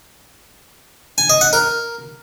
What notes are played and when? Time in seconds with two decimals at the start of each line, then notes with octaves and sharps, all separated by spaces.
1.18 G#5
1.30 D#5
1.41 F#5
1.53 A#4